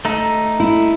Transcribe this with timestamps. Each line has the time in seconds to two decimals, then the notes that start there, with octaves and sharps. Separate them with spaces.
0.05 A3 D#4
0.60 E4